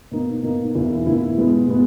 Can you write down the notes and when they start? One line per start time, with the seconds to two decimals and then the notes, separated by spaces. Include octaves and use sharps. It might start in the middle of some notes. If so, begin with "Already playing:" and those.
0.11 B2 A#3 D#4
0.43 B2 A#3 D#4
0.75 E2 B2 A#3 E4
1.06 E2 B2 A#3 E4
1.38 B2 G#3 B3
1.69 B2 G#3 B3